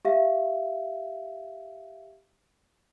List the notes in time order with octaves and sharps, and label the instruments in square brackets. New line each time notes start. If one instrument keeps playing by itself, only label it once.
[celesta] G4 E5 F5